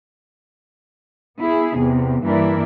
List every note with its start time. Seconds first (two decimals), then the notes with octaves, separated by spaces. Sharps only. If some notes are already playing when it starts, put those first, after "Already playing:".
1.39 B3 E4 G#4
1.76 E2 C3
2.24 G2 E3 A#3 E4 A#4 D5